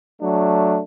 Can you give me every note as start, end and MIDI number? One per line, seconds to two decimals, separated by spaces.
0.22 0.82 54
0.22 0.82 57
0.22 0.82 62